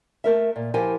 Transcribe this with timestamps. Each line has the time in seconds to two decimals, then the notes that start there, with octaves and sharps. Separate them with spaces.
0.24 A3 A#4 E5
0.56 A#2
0.74 F3 E4 G4 A#4 G5 G#5